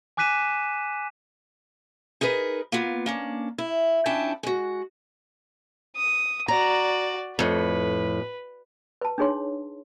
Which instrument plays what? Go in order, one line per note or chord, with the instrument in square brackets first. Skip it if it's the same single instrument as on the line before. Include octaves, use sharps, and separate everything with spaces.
[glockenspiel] G#5 D6 F#6 B6 D#7 E7
[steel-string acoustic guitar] D#4 G#4 A#4 B4
A#3 B3 F4
A#3 C#4 D4
E4
F2 C#4 D4 E4 G5 A5
G#3 F#4
[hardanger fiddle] D#6
[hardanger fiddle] F#4 D5 [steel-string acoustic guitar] A#5
[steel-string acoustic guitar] F2 A2 [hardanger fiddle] B4
[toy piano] B4 A5
D4 D#4 G#4 C#5 C6